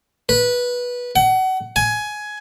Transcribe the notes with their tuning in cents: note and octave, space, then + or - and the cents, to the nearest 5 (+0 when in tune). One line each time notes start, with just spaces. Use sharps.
B4 -15
F#5 +30
G#5 +15